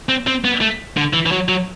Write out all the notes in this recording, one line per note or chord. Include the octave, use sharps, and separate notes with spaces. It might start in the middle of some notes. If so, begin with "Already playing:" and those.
C4
C4
B3
A3
D3
E3
E3
F#3
F#3